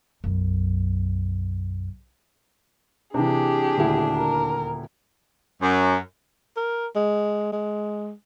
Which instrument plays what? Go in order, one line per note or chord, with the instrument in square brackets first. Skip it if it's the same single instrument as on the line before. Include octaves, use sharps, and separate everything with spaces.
[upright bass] B1 F#2
[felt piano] C3 E3 [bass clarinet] D4 [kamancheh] G4 G#4
[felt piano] D#1 D2 E4
[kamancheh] A#4
[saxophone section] F#2
[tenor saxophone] A#4
G#3
G#3